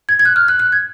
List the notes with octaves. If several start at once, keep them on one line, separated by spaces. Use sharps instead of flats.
G#6
G#6
F#6
F6
F#6
F#6
G#6